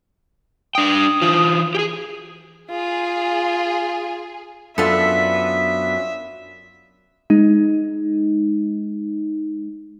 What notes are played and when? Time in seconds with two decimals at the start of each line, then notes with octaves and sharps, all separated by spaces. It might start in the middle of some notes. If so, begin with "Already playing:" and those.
0.75 D4 G5 D#6
1.22 E3 F4
1.75 G4 G#4
2.71 F4 G#4
4.78 F#2 B3 D4 F4 A4 B4 E5
7.30 G#3 D#4